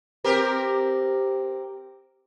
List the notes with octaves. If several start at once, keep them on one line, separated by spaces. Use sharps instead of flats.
C4 G4 A#4